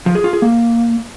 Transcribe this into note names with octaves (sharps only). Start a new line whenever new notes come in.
F3
G#4
F4
G#4
A#3